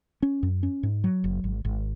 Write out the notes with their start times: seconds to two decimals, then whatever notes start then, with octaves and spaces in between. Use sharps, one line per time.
0.23 C#4
0.43 F#2
0.63 C#4
0.83 G#2
1.04 F#3
1.24 F#1
1.44 G#1
1.65 G#1